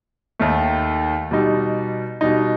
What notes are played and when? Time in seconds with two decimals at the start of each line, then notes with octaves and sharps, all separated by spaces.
0.39 D#2 D#3 A3
1.31 B2 G3 D#4
2.21 B2 G3 D#4